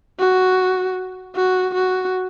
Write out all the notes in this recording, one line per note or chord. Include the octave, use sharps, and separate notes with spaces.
F#4
F#4
F#4